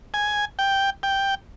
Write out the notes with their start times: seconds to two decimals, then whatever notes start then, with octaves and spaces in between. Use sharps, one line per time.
0.14 G#5
0.59 G5
1.03 G5